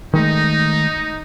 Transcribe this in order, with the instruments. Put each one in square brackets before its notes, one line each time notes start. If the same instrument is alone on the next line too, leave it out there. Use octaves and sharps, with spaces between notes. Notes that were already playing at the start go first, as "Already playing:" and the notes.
[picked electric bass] D#3 G#3 A3 [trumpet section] D#4